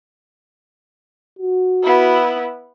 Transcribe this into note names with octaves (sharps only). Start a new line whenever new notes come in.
F#4
B3 E4